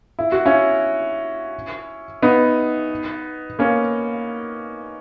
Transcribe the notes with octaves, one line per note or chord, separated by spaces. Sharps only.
E4
F#4
C#4 E4
B3 D#4
A#3 C#4